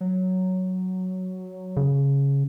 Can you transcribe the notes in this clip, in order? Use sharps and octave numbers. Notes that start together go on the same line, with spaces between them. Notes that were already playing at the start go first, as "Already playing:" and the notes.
F#3
C#3